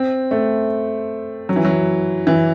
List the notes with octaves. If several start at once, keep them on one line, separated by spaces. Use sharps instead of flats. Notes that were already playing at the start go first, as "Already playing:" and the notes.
Already playing: C4
A3
F#3
E3
F#3
E3